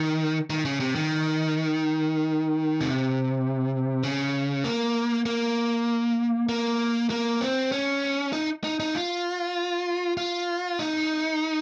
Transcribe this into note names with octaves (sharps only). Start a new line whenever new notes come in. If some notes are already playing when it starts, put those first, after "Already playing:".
Already playing: D#3
D#3
C#3
C3
D#3
C3
C#3
A#3
A#3
A#3
A#3
C4
C#4
D#4
D#4
D#4
F4
F4
D#4